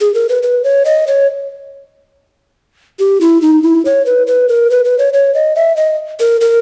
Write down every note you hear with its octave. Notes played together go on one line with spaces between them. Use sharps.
G#4
A#4
B4
B4
C#5
D#5
C#5
G4
E4
D#4
E4
C#5
B4
B4
A#4
B4
B4
C#5
C#5
D#5
E5
D#5
A#4
A#4